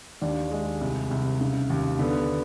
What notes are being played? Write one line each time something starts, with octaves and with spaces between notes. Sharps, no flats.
D#2 D4
G#3
C2
C2
C#3
D#2
D3 B3